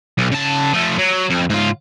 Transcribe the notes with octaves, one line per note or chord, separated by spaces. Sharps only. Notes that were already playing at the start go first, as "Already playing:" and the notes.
B1
C#3 A5
F3 A3
F#3
F2
G#2 F4